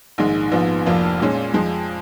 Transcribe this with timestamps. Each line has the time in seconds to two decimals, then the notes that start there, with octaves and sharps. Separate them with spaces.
0.18 A#1 G#2 D#3 G#3
0.52 A#1 G#2 F3 B3
0.86 F1 F2 F3 A#3 F4
1.20 A#2 G#3 C#4
1.54 F2 F3 G#3